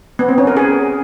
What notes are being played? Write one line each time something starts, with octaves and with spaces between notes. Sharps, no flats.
B3
C4
C#4
A#4
G#4